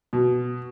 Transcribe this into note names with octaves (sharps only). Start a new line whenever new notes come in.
B2